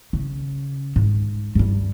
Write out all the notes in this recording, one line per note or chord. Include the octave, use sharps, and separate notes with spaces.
C#3
G#2
G2 G3